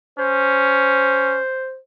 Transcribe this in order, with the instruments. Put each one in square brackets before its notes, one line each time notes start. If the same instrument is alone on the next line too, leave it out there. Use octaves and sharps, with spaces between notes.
[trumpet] C#4 [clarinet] C5